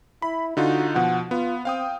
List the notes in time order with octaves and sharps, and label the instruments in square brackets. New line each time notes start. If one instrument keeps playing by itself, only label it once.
[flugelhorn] E4 [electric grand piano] B5
[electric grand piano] D3 D#4 F4 [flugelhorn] F#4
[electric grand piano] B2 F3 [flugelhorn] F#5
[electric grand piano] B3 [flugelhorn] F4
[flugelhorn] C4 [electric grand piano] F5 G5 D#6